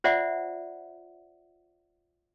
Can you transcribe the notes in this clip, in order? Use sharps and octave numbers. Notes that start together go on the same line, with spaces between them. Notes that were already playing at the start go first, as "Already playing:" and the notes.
F4 C5 D5 E5 F#5